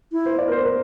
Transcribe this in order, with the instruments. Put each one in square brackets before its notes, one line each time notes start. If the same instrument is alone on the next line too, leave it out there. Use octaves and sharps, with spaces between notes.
[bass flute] E4
[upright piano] C5
D5
A#4
C5
A#4